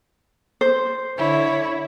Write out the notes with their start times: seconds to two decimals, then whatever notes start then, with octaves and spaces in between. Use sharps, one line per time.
0.61 C5
1.16 D3 E4 C#5